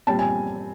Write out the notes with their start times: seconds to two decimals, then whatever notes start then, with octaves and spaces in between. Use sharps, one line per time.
0.07 A#2 G3 C4 A5
0.19 G#5